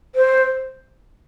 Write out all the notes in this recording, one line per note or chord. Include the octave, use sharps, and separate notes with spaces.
C5